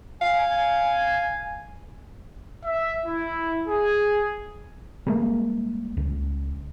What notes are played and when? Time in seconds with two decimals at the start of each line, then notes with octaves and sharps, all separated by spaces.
0.22 F5 G#5
2.65 E5
3.05 E4
3.68 G#4
5.07 G3 G#3 A#3
5.97 C#2